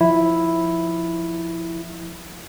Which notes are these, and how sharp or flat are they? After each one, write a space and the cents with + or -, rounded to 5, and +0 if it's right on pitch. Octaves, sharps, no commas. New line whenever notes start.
F3 +0 E4 +0